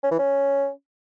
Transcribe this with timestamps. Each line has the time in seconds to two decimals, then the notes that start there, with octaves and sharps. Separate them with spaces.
0.03 C#4
0.11 E3
0.19 C#4